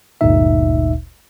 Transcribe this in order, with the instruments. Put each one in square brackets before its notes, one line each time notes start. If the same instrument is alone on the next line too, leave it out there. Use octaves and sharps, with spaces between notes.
[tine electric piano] G1 D2 A#2 D#4 E5